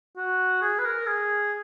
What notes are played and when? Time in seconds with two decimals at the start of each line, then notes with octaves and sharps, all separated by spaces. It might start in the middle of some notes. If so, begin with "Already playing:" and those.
0.17 F#4
0.62 G#4
0.79 B4
0.86 A#4
1.07 G#4